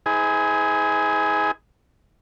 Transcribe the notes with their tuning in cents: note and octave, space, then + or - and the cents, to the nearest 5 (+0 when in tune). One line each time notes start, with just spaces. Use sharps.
D#4 +45 G#4 +0 B4 +45